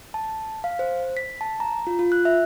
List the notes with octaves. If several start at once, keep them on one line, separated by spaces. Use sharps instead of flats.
A5
F5
C5
B6
A5
A#5
F4
F4
F#6
E5